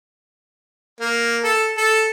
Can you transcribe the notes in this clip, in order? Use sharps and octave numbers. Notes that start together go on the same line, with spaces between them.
A#3
A4
A4